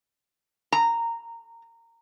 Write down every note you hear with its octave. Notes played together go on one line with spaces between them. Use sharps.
A#5